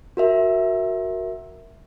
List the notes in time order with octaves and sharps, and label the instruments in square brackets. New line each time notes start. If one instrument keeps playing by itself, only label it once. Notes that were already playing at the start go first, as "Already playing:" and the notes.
[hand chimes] F#4 A#4 E5